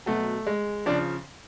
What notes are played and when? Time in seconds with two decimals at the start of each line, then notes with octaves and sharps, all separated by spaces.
0.06 B2 F#3 A3
0.47 G#3
0.86 C#3 F3 D4